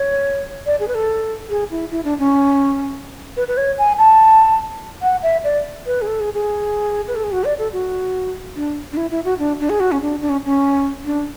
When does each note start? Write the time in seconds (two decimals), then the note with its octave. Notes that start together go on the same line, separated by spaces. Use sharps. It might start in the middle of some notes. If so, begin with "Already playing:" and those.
Already playing: C#5
0.66 D5
0.80 G#4
0.88 B4
0.95 A4
1.50 G#4
1.71 E4
1.91 E4
2.04 D4
2.19 C#4
3.37 B4
3.48 B4
3.57 C#5
3.78 G#5
3.98 A5
5.02 F#5
5.23 E5
5.44 D5
5.86 B4
6.02 G#4
6.07 A4
6.20 G#4
6.34 G#4
7.08 B4
7.15 A4
7.23 G#4
7.32 F#4
7.44 D5
7.58 A4
7.73 F#4
8.56 D4
8.93 D4
8.97 E4
9.11 E4
9.25 F#4
9.39 D4
9.60 D4
9.70 G#4
9.80 F#4
9.92 C#4
10.01 D4
10.21 D4
10.29 C#4
10.45 C#4
11.05 D4